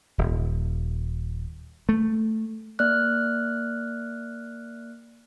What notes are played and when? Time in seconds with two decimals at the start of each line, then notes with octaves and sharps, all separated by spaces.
0.18 D#1
1.89 A3
2.79 A#3 D5 F6 F#6